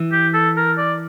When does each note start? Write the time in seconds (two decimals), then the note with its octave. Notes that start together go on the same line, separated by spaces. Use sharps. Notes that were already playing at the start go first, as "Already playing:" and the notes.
Already playing: E3
0.12 G4
0.34 A4
0.57 A#4
0.78 D5